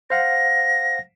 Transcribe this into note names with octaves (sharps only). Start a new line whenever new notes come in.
C5 F5 F#5 A#6